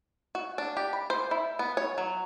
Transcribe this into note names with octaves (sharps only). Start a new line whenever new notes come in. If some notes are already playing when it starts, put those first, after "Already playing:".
F#4
D4
G4
B5
C5
E4
B3
C#5
F#3